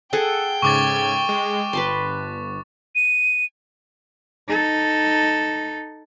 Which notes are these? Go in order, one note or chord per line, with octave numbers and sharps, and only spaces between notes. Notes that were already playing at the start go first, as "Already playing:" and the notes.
G#4 A4 F#5 G5
G#2 C#3 C#6 D6 G#6 A6
G#3
G1 B4 A5 C6
D#7
D#4 A4